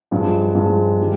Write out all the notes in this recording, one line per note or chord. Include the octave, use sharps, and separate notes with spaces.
G2 F3 G#3
G2 F3 G#3
D#3 G3